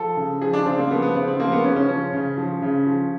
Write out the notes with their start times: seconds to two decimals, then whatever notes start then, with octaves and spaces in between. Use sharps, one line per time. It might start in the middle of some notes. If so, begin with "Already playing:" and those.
Already playing: F3 A4
0.17 C#3
0.41 F3 G#4
0.53 D4
0.65 C#3 C4
0.78 A#3
0.91 F3 B3
1.02 B3
1.15 C#3 C4
1.27 C4
1.39 F3 A#3
1.52 B3
1.64 C#3 C#4
1.76 C#4
1.89 F3 C#4
2.13 C#3
2.37 F3
2.62 C#3
2.87 F3